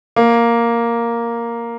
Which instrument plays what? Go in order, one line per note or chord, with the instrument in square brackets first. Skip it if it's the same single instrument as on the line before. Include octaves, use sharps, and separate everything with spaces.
[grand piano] A#3